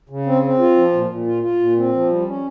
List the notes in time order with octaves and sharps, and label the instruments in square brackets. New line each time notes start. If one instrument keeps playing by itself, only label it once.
[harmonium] C#3
C4
C4
F4
F3
A#2
A#2
F4
F4
A#2
C4
F3
G3
C#4